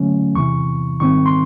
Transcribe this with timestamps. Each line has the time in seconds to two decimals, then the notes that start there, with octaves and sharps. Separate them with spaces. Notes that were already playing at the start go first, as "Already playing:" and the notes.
Already playing: D3 F#3 A3 C#4
0.35 E2 C3 E3 C#6
1.00 G#2 D#3 G3 C4 C#6
1.26 C6